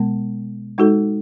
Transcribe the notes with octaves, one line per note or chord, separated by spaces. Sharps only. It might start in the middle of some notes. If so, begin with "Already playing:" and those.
Already playing: B2 G#3 B3
G#3 D#4 F#4 A4